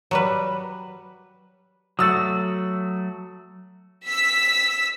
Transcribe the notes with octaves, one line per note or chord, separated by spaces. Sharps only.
F#3 G3 B4
F#3 A3 F#4 D#6 E6 A6
E6 B6